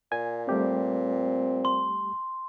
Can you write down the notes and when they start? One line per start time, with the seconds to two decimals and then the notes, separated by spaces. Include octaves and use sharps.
0.12 A#2 G#5
0.49 G3 A3 C4 G4
1.65 C6